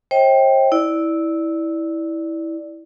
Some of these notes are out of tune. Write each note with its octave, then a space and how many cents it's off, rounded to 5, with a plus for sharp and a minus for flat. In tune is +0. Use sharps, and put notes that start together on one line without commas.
C5 +40 D#5 +35 G5 +0
E4 -15 D5 +0